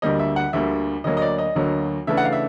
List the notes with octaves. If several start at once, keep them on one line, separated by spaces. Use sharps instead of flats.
D2 D3 G3 A#3 D#5
E5
F#5
D2 D3 G3 A#3 E5
D2 D3 F#3 A#3 D#5
D#5
D5
D#5
D2 D3 F#3 A#3
C#3 E3 A3 D4 E5
F#5
F5
E5